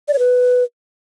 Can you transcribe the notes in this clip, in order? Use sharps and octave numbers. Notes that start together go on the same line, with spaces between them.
D5
C#5
B4